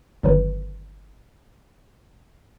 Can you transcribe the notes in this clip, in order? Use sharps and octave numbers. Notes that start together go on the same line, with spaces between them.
G1 D#3 F#3 B4